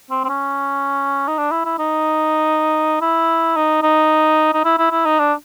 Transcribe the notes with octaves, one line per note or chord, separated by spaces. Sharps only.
C4
C4
C#4
D#4
D4
E4
E4
D#4
E4
D#4
D#4
D#4
E4
E4
E4
D#4
D4